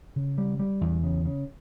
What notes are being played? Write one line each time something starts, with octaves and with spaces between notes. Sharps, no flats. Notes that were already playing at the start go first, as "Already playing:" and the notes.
C#3
G3
G3
E2
C#3
C#3